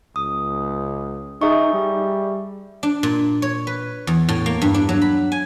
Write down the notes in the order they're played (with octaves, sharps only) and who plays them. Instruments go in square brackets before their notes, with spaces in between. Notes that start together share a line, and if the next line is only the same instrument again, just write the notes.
[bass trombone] C#2 [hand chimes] D#6
[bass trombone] D#4 [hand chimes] G#4 E5 C#6
[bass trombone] G3
[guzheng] D4
A#2
C#5
B4
E2
A2
A#3
G2
D4
F#3
B5
G#5